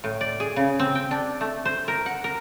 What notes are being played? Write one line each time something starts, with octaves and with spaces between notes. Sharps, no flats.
A2
D5
G#4
C#3
C4
G5
D4
A3
C5
A#4
F#5
A#4